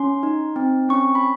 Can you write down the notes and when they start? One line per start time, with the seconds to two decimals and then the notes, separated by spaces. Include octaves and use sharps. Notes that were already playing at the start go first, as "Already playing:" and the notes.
Already playing: C#4 C6
0.23 D#4
0.56 C4
0.89 C#4 C#6
1.15 B5